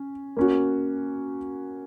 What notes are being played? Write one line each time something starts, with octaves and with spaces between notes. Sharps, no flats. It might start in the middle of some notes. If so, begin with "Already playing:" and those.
Already playing: C#4
A#3 C#4 F#4